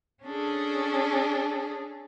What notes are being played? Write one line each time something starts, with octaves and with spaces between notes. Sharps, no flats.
C#4 D4 G#4 A4